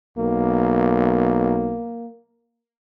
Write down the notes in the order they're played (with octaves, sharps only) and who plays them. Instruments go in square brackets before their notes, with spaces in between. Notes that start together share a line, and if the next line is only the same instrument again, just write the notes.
[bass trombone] B1 [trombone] A#3